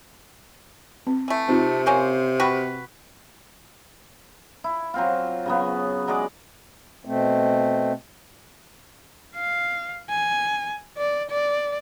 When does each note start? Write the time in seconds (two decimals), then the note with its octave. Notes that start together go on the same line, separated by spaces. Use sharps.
1.07 C4
1.28 E3 A3
1.49 C3 C4 D#4 F4
1.86 A#3 C#4 A#4 C5 G#5
2.40 F#4 B4 G5 B5
4.64 E4
4.94 F#3 C4 F4
5.46 C#3 F#3 B3
6.08 F#3 G#3 G#4 D5
7.05 B2 A3 C4
9.35 F5
10.10 G#5
10.97 D5
11.30 D5